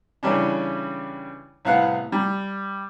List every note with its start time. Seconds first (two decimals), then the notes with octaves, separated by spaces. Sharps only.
0.23 C#3 E3 G3 C#4 D4
1.65 C2 A2 B3 F5 F#5 F#6
2.12 G3